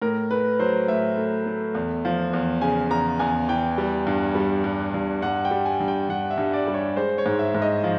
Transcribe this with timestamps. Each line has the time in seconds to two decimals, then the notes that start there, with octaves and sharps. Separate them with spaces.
0.02 A2 A#4
0.31 A3 B4
0.59 F#3 C5
0.88 A2 E5
1.17 A3
1.46 A3
1.75 E2
2.05 F3
2.33 E2
2.61 C#3 G#5
2.90 E2 A#5
3.19 E2 G#5
3.48 E3 G5
3.78 G3
4.07 G2
4.35 G3
4.64 G2
4.94 G2
5.22 G2 F#5
5.45 G5
5.51 G3
5.65 G#5
5.80 G2
5.88 G5
6.09 G2 F#5
6.30 E5
6.38 G2
6.53 D5
6.68 G3
6.74 C#5
6.96 G#3 C5
7.18 C#5
7.26 G#2
7.39 E5
7.55 G#2
7.62 D#5
7.84 F3